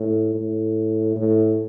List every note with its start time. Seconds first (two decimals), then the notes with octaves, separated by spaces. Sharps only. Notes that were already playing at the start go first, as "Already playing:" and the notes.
Already playing: A2
0.35 A2
1.16 A2